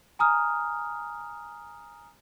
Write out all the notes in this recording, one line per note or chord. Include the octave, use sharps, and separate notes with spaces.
G#5 A#5 D#6 F6